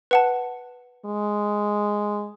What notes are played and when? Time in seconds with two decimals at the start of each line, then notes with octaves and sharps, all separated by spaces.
0.11 B4 F#5 A5
1.05 G#3